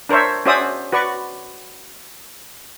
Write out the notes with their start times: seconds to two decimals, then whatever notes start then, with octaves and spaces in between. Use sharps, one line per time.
0.09 D4 A#4 C5 C#5 E5
0.46 C#4 F#4 C5 D5 E5 D#6
0.92 F#4 B4 D5 C#6